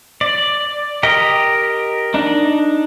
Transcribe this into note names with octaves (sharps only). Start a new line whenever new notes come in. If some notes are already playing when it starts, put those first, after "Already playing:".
D5
G4 A#4 D#5
D4 D#4